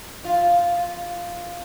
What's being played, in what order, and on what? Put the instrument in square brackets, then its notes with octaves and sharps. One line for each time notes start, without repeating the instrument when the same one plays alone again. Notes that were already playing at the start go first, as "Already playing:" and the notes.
[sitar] F4